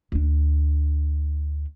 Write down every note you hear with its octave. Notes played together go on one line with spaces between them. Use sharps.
D2 D4